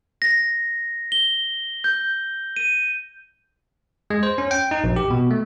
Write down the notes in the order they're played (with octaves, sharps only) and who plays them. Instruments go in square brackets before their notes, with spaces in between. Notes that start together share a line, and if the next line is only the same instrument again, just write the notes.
[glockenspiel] A#6
G7
G6
D#7
[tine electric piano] G#3
C5
C#4
G5
D#4
A#1
G4
B2
A3